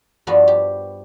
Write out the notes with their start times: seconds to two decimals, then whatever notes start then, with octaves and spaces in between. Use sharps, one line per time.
0.27 G2 F3 B3 D4 F#4
0.48 G4